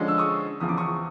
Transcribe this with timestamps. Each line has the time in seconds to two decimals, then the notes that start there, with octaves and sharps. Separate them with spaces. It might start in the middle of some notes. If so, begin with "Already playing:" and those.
Already playing: D3 F3 G#3 C#4
0.08 E6
0.18 C#6 D#6
0.60 E2 C#3 F3 D#6
0.69 D6
0.78 C#6 D#6